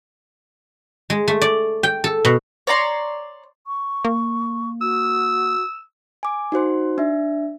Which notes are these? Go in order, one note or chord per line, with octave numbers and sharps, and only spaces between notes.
G#3
A3
D5
G5
A4
B2
C#5 D5 A#5 C6
C#6
A#3
F#4 E6
G#5 D6
D#4 F#4 C5 C6
D4 E5